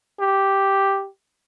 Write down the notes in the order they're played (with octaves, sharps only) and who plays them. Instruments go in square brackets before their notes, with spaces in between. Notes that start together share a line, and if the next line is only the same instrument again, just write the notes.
[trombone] G4